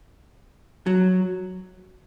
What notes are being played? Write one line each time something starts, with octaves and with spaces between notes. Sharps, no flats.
F#3